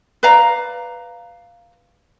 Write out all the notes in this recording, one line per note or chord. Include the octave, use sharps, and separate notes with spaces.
B4 D5 F5 A#5